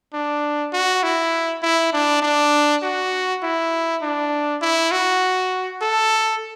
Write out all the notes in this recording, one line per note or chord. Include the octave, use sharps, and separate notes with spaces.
D4
F#4
E4
E4
D4
D4
F#4
E4
D4
E4
F#4
A4